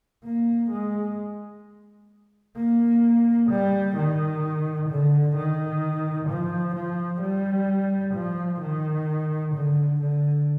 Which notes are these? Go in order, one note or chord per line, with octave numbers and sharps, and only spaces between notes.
A#3
G#3
A#3
G3
D#3
D3
D#3
F3
F3
G3
F3
D#3
D3
D3